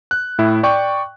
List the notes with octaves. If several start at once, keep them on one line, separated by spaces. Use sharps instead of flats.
F#6
A2 E4
D5 G5 C#6